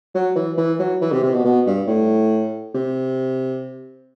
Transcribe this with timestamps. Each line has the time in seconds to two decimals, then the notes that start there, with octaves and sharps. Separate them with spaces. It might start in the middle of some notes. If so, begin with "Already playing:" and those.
0.15 F#3
0.36 E3
0.57 E3
0.79 F#3
1.01 E3
1.12 C3
1.23 C3
1.33 B2
1.45 B2
1.66 G2
1.87 A2
2.75 C3